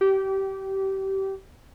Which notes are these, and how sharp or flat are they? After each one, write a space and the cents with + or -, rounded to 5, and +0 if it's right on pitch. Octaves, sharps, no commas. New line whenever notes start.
G4 -25